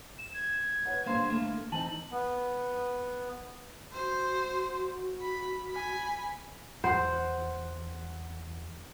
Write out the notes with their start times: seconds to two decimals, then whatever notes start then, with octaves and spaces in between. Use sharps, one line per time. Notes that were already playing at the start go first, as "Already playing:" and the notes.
0.19 E7
0.34 G#6
0.85 B4 C#5 F#5
1.06 G2 D3 A#3 C5 F5
1.30 A3 A#3 E4
1.72 E3 C4 D#4 A5 F#7
2.12 B3
3.93 F#4 C5
5.21 B5
5.70 G#5 B5
6.84 E2 C5 F#5